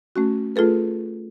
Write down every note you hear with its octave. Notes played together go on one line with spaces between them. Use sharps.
A3 C#4 F#4
A3 F4 G#4 A4 B4